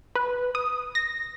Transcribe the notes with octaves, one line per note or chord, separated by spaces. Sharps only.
B4
D#6
A#6